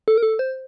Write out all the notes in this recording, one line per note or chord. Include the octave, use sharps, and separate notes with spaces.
A4
A#4
A4
C5